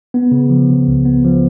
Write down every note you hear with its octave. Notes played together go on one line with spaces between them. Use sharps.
B3
C#3
F3
C#3
C#2
B3
F3